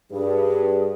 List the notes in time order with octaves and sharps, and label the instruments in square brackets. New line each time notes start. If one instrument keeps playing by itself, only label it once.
[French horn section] G2 [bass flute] G#4